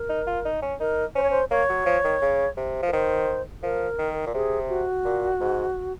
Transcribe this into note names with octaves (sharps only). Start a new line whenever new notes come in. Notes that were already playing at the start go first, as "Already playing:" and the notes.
Already playing: A#4
D#4
F4
D#4
C#4
D#4 A#4
C#4 C5
C#5
C5
A#3 C#5
F#3
F3
D#3
C#3
C3
F3
A#4
D#3 C5
F3 A#4
D#3
A#2
C3 G#4
F#4
A#2
G#2